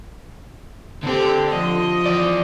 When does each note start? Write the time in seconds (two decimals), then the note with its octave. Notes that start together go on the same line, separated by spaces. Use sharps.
1.03 D3 C4 G4 A4
1.50 F3 D#5
2.06 E3 D5